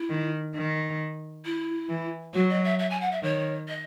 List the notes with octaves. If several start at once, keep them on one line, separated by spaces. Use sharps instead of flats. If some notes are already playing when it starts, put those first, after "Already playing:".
Already playing: E4
D#3
D#3
E4
E3
F#3 F#4
D#5
E5
E5
G#5
F#5
E5
D#3 C#5
D#5